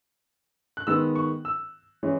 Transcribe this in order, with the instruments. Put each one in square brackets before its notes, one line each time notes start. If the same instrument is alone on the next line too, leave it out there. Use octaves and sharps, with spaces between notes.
[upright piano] F#6
D#3 G#3 B3 E6
C#6
E6
E3 G#3 C#4